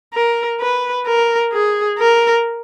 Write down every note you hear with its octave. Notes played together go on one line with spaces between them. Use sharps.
A#4
B4
A#4
G#4
A#4